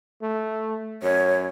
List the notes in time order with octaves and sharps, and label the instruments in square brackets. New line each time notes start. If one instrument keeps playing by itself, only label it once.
[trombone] A3
[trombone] F#2 [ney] C#5